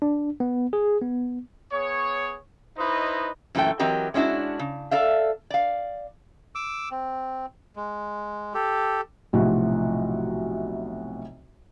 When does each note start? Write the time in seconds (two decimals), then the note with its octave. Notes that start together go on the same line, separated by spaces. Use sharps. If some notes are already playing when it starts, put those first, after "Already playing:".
0.02 D4
0.40 B3
0.73 G#4
1.02 B3
1.72 B3 G#4 C#5
2.77 D#4 E4 B4 C5 D#5
3.55 F#2 A#2 E3 A3 A4 G5
3.79 E3 F#3 C4 G4 A#4 D#5
4.14 G#3 C#4 D4 E4 F#4
4.59 C#3
4.91 A4 D5 E5 F5
5.50 D5 F5
6.55 D6 E6
6.91 C4
7.76 G#3
8.54 G4 A4
9.33 B1 A2 C3 F3 F#4